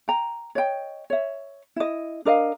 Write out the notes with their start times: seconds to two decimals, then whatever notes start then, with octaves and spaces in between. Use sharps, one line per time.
0.08 G5 A#5
0.55 C#5 D#5 G5
1.10 C#5 E5
1.76 E4 D#5
2.25 D4 A#4 D#5 F5